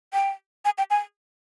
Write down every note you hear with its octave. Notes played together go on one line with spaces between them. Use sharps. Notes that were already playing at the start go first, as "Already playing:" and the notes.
G5
G#5
G5
G#5